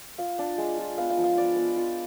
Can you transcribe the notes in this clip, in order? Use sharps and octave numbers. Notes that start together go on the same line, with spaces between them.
F4 F5
D4
G#3
F4
B3 F5
F5
F3
F5
B3 D5
B3
F4